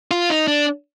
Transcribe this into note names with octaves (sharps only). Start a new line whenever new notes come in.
F4
D#4
D4